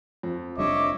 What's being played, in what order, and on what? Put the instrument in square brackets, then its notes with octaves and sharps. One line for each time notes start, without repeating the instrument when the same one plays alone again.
[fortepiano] F2
[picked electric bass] F1 G3 D4 [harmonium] C#5 D#5 E5 [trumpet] D6